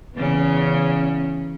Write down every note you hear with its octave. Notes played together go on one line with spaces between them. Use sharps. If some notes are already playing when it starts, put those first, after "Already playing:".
E2 C#3 C#4